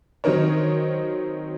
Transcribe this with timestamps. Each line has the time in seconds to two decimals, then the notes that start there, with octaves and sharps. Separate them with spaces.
0.24 D#3 F#3 C4 D#4 A#4 C#5